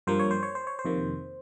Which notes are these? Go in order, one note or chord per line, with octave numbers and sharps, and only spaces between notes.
G2 F3 A#3 C5
C#5
C5
C#5
C5
C#5
C5
F2 C3 D#3 A#3